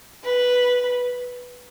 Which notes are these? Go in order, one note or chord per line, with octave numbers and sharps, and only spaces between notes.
B4